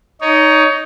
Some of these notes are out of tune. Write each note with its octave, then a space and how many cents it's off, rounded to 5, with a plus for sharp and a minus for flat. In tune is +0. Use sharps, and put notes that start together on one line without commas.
D#4 +0 C#5 +20